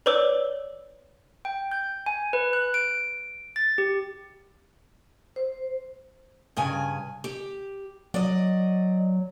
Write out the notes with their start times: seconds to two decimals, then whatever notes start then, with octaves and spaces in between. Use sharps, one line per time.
0.06 B4 C#5 D5 D6 E6
1.45 G5
1.71 G6
2.06 G#5
2.33 B4
2.53 F#6
2.74 D7
3.56 A6
3.78 G4
5.36 C5
6.57 G2 C#3 G#5
7.24 G4
8.14 F#3 D5 D#5